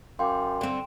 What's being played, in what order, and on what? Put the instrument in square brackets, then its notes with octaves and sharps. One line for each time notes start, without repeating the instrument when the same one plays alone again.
[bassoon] F#2 [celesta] F5 D6 [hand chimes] G5 C6
[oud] D3 C4